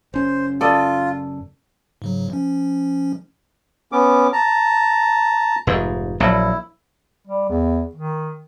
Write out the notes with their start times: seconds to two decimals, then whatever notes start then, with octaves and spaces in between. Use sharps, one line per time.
0.14 F#1 C#4 C5
0.61 F4 A4 D5 D#5
2.02 G#2 C#3 F#3
2.30 F3 C#4
3.92 B3 C#4 D6
4.33 A5 A#5
5.67 F1 G#2
6.20 A#1 F#3 E4
7.27 G3
7.49 E2
7.95 D#3